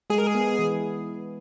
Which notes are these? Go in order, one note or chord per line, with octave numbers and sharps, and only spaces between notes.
G#3 G#4
A#4
G#4
B3
E3